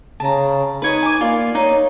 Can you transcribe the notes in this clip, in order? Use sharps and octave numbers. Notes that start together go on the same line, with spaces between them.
C#3 A5 A#5
D#4 B4 C#5 D#5
G#5 D6
A#3 F4 D5
D#4 C#5